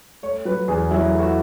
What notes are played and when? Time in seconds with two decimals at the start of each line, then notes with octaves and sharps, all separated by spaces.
0.23 A3 C#5
0.45 F#3 B4
0.68 E2 G#4
0.91 F#3 E4
1.13 A3
1.19 F#4
1.24 E4